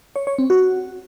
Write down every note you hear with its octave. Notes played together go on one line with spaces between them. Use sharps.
C#5
C#5
C4
F#4